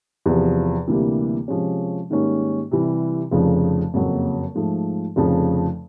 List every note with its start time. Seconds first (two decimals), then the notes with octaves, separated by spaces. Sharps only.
0.26 E2 C3 F3
0.87 D2 C3 E3 G3 A#3
1.48 C3 F3 G#3 C#4
2.10 G#2 D#3 G3 A#3 C#4
2.71 C3 E3 G3
3.31 F1 F2 C#3 F3
3.94 F#1 F2 C#3 F#3 A#3
4.55 G#2 F3 A3
5.16 F1 F2 C#3 F3